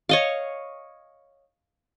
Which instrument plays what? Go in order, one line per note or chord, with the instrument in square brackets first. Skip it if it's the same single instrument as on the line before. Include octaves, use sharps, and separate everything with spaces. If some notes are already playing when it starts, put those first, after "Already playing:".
[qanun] C#5 D#5 F5